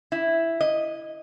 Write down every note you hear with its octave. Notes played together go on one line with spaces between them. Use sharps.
E4
D#5